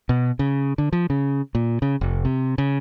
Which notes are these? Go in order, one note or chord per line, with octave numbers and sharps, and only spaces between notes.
B2
C#3
D3
F3
C#3
A#2
C#3
F1
C3
C#3